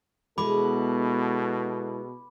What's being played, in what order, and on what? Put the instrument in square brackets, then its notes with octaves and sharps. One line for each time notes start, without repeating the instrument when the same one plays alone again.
[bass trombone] B2 [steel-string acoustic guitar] G#3 B3 E4 [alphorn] A4 [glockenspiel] B5 D6